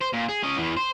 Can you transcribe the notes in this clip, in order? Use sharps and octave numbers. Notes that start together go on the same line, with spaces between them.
C5
A#2
G#4
C#4 D#5
E2 E3
C5